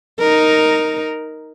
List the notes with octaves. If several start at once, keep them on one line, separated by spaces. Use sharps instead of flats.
D#4 A#4